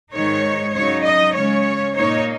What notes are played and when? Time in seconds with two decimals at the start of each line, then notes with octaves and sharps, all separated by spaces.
0.13 G#2 D#3 G#3 D#4 C#5
0.73 C#3 F#3 D#4 C#5
1.03 D#5
1.34 C#3 G#3 C#4 C#5
1.95 A#2 A#3 D#4 C#5